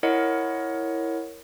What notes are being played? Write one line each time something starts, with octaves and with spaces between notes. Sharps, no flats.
E4 A#4 C#5 D#5 F#5